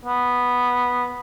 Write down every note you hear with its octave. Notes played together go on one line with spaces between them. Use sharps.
B3